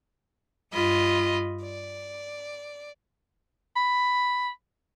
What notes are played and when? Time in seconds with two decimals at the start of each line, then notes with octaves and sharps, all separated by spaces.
0.73 G2 F4 D#5 B5
1.62 D5
3.76 B5